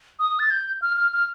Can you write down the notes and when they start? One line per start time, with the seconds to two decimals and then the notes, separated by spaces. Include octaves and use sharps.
0.19 D#6
0.39 A6
0.51 G6
0.82 F6
0.97 F6
1.13 F6